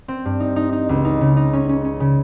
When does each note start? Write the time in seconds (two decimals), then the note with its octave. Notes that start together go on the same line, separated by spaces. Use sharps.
0.08 C4
0.25 G2
0.40 D#4
0.56 D#4
0.72 D#4
0.89 C#2
1.05 D#4
1.21 C#3
1.37 D#4
1.53 C#4
1.69 C#4
1.84 C#4
2.00 C#3